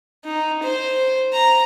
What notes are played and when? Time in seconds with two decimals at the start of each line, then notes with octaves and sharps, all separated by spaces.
0.25 D#4
0.63 C5
1.33 A#5